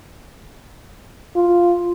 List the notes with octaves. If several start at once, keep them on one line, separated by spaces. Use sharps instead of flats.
F4